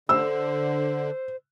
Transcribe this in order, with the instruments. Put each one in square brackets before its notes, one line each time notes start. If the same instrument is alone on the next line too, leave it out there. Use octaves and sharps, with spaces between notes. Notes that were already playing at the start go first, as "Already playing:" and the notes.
[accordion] D3 [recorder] C5 [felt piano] E6